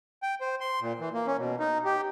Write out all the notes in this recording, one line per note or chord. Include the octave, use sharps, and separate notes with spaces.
G5
C5
C6
A#2
E3
A#3
C#4
B2
D#4
G4